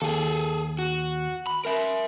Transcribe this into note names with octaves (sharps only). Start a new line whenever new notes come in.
D#2 G#4 A4
F#4
B5
A#4 E5